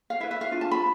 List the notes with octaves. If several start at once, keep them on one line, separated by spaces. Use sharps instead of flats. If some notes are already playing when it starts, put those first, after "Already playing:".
F5
E4 B4 E5
E5
F5
D4 F4
A5
B5